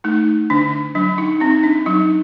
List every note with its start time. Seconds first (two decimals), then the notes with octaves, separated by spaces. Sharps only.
0.04 A3 D#4
0.50 D3 D4
0.95 F#3 D4
1.18 D#4
1.40 C4 D#4
1.63 D4
1.86 F#3 D#4